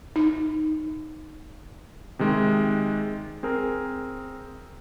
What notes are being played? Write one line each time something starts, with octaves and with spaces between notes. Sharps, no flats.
D#4
C3 D#3 G#3
C4 G#4 A#4